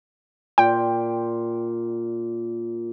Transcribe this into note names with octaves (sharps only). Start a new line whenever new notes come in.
A#2 G5